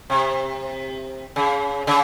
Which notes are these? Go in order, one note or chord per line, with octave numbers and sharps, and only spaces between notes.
C3
C#3
C#3